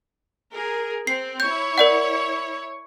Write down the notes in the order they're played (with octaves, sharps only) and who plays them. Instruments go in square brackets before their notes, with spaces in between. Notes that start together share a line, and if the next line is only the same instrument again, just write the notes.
[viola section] G#4 A#4
[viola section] C4 [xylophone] C7
[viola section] E4 C#5 [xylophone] G6
[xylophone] A#4 D5 F#5